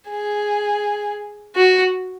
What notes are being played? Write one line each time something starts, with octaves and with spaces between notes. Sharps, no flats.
G#4
F#4